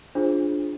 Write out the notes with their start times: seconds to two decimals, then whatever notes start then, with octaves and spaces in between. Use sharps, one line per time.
0.15 D4 F4 G#4 C5